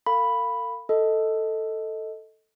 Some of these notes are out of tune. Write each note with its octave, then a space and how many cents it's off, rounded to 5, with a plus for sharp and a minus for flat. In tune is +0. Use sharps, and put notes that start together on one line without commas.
A4 +45 F5 +0 B5 +0
A4 +5 D#5 +15